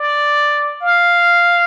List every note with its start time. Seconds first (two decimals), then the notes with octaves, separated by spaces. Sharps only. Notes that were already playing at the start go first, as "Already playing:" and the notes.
Already playing: D5
0.81 F5